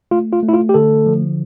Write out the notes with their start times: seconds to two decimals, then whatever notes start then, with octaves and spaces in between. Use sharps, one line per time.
0.11 A3 F4
0.33 F4
0.43 A3
0.49 E4
0.53 F4
0.69 G4
0.74 D3 A4
1.06 F3